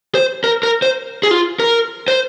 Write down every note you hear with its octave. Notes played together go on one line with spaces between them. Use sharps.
C5
A#4
A#4
C5
G#4
F4
A#4
C5